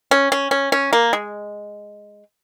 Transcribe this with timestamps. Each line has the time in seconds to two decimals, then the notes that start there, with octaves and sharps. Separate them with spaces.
0.11 C#4
0.32 C#4
0.51 C#4
0.72 C#4
0.93 A#3
1.13 G#3